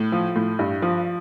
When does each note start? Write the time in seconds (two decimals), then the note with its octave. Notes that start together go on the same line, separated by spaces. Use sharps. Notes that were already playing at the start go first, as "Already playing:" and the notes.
Already playing: A2
0.12 F3
0.36 A2
0.59 G2
0.82 F3